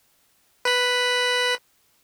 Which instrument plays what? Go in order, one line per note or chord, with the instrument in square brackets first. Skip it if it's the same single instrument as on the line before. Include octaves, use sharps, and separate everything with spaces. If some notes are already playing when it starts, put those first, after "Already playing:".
[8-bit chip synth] B4 B5